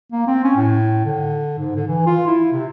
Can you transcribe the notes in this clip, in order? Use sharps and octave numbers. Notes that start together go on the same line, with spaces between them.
A#3
C4
C#4
A2
D3
G#2
D3
E3
F4
E4
C3